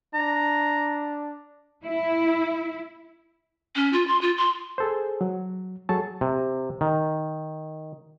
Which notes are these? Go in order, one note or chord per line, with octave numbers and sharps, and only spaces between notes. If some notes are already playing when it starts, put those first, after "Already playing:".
D4 A#5
E4
C#4
F4
C6
F4
C6
G#4 A4 C5
F#3
F#3 G#4 A4 A5 C#6
C3
D#3